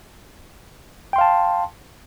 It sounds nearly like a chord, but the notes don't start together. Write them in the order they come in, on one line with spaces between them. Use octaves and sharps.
G5 C6 F5 A5